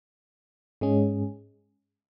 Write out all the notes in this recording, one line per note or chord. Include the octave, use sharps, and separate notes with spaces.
G#2 G#3 C#4 G#4